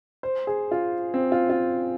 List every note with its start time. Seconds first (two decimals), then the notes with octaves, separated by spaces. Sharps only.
0.23 C5
0.47 G#4
0.71 F4
1.14 C4
1.32 F4
1.50 F4